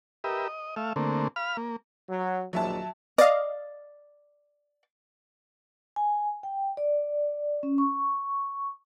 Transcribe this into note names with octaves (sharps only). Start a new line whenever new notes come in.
G4 A#4 B4 D#5 E5
D#5
A3 E5 F5
D3 A3 A#3 C4
F5 B5 F6
A#3
F#3
A#1 D#2 F#3 E5 A5
D5 D#5 F5
G#5
G5
D5
C#4
C#6